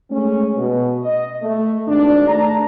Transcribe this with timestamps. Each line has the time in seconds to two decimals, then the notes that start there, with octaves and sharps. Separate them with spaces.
0.11 G#3 A3 C#4
0.57 B2
1.00 D#5
1.42 A3
1.87 G#1 D4
2.28 A3 D5 A5 A#5